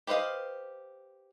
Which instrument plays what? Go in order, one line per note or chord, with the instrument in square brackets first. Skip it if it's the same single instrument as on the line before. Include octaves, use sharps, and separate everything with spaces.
[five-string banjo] G4 B4 C5 D#5 F5